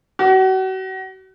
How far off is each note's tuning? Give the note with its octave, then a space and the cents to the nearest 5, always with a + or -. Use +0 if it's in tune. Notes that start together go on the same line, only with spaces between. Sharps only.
F#4 +35